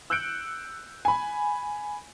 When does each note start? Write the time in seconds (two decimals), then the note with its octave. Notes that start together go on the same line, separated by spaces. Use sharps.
0.10 E6 F#6 G6 C#7 D7
1.05 G#5 B5